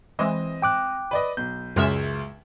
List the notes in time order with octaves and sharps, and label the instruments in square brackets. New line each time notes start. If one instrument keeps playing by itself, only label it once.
[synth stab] E3 G#3 [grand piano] C4 D#5
[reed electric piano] G5 D6 F#6
[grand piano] B4 D5 D#5
[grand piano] B1 [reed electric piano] G6
[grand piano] C#2 C#3 F6 [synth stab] F#2 G#3 E5